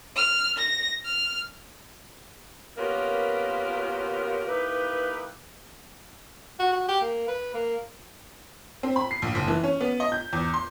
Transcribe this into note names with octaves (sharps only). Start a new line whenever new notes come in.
F6
A#6
F6
A#3 B3 C#4 F4 G4 A#4
A#3 D#4 E4 G4 B4
F#4
F#4
G4
A#3
B4
A#3
C4
B5
C7
A#1
F#1
E3
C#4
B3
D#5
G6
E2
C6